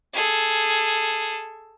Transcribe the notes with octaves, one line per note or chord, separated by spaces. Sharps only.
G#4 A4